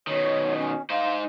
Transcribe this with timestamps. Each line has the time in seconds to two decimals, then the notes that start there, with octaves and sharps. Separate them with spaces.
0.07 B2 D#3 C#5
0.57 C#4
0.90 D#4 C5 F5